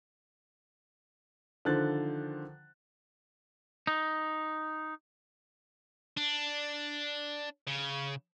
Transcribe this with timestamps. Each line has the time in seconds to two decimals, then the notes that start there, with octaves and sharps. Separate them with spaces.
1.65 D3 D#3 F3 C5 F#6 A6
3.87 D#4
6.17 D4
7.67 C#3